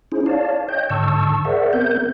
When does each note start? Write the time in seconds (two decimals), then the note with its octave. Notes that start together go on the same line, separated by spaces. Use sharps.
0.12 C#4 D#4 E4 G#4 C5
0.26 C#5 D5 F5 A5
0.68 C#5 D#5 G5 G6
0.90 G#2 D3 A5 C#6 E6
1.45 G#4 A#4 C5 D5 E5 F#5
1.73 B3 C4 A#4 G6